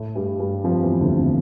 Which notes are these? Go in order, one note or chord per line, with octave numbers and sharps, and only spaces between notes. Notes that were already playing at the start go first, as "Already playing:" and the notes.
Already playing: A2 A3
G2 G3
G2 G3
F2 F3
E2 E3
D2 D3
C3